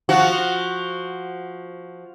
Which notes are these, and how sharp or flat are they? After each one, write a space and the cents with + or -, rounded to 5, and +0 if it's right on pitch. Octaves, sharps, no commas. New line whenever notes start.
F3 +0 F#4 +0